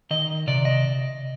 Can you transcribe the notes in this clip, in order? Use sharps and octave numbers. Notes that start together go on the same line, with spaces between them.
D#3 D#5
C3 D5
D#5